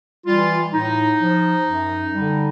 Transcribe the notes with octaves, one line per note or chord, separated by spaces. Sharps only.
E3 G3 F4
A2 D#4
F3
F#2
D3 G3